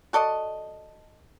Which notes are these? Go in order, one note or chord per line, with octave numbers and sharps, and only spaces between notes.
F#4 A4 D5 D#5